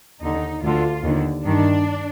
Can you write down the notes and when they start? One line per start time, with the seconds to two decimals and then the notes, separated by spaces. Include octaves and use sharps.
0.22 D#2 D3 D#4
0.63 D2 D3 F4
1.04 D#2 D3
1.45 G2 D#3 D4